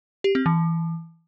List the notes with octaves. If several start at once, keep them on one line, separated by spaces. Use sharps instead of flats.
G4
C4
E3